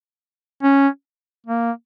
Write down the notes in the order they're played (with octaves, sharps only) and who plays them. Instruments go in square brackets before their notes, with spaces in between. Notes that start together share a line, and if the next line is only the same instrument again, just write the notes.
[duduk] C#4
A#3